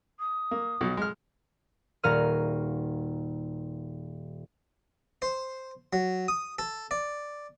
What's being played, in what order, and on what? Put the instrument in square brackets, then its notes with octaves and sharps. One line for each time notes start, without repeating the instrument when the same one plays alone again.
[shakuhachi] D#6
[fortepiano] A#3
B1 B2
G#3 F6
[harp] D#1 F#4 A#4 F5 F6 D#7
[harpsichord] C5
F#3
D#6
A4
D5